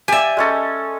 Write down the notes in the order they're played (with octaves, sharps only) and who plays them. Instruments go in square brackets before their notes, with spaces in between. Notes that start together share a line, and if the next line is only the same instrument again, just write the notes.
[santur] G4 D5 [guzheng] E5 G#5
[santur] G#3 C#4 A4